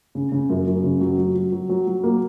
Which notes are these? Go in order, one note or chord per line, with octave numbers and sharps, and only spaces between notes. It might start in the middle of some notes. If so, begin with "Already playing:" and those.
C#3
C#3
F#2
F#2
C#3
F#3
F#3
F#3
F#3
F#3
F#3
A#3